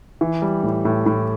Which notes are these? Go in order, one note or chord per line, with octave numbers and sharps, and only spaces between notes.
E3
G3
A2
A2
A2